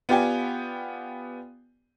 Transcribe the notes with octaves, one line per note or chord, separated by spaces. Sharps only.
B3 F4 G4 D5 G5 G#5